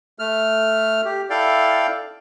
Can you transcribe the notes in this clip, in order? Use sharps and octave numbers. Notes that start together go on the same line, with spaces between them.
A3 F6
G4
E4 A4 D5 F5 G5